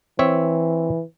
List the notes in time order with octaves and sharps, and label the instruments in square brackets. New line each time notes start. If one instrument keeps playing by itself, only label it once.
[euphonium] E3 [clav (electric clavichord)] C4 C#5 E5